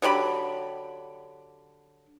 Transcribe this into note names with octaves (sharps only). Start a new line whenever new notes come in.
D3 F#3 G4 B5